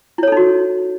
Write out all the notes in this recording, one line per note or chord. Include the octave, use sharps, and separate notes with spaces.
D#4 E4 F#4 A4 C#5